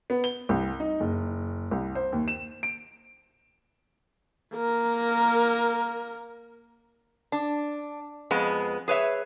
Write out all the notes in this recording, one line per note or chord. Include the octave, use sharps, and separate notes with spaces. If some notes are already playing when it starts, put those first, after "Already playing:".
B3
G7
C2
D#4
F#1
C2
C5
D#2
E7
D7
A#3 A#4
D4
F2 G#3 B3
G#4 B4 C#5 E5